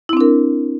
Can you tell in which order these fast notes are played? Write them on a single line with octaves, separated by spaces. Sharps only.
E4 C4 D4 A#4